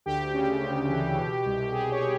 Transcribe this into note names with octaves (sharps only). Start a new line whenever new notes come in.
D2 G4
C#3
D2
E3
B2
C2
C2 G#4
C#5
B2